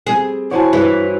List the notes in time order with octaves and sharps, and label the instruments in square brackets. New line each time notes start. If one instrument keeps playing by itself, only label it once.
[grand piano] G3 C4 [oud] G#4
[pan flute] E4 [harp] F#4 C5 C#5 [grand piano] F#5 G#5 A5
[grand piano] G2 [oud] E3